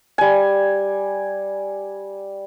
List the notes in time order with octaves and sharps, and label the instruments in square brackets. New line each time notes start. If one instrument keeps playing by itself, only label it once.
[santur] G3 G#5